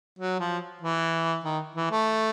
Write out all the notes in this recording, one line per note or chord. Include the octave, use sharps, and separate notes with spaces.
F#3
F3
E3
D#3
E3
A3